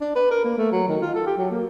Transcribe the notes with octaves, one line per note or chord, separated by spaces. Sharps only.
D4
B4
A#4
A#3
A3
F#3
D#3
F4
A4
G4
F#3
A#3